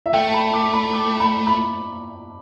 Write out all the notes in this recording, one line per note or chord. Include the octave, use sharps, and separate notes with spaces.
E5
A3 G5
A5
B5
D6
B5
D6
B5
B5